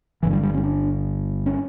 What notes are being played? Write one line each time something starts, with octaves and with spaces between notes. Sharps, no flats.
G1 G2 D3 E3
G3
G3
C#4
D4
C#4